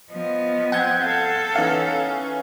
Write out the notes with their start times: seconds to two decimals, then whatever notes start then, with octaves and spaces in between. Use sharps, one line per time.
0.11 F3 B3 D#5
0.72 C4 F#5 G6 G#6
1.02 A4 F5
1.56 E3 C#4 D#4 F5